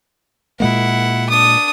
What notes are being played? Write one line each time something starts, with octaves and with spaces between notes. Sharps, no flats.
A#2 G#3 A#3 E4 F#5
D4 D#6